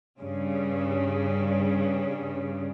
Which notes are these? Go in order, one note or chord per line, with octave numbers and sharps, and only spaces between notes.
G2 C#3